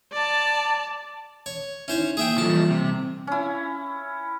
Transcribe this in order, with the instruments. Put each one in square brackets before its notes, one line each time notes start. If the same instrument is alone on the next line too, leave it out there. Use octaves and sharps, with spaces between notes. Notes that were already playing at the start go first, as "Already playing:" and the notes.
[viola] D5 A5
[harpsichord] C#5
[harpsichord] C#4 C5 C#5 [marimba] D#4 E4 E5
[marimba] A#3 [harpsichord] G#4 E5 G5
[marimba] E3 G3 [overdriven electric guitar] F3 A3 [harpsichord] A5
[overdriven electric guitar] C3
[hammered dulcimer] C#4 E4